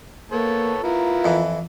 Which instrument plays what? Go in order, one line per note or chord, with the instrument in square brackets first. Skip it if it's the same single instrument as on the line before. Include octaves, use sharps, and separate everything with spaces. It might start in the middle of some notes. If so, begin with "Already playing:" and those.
[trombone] A#3 [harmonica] B3 A4 C#5
[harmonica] B3 E4 A#4 [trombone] F4
[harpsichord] F2 E3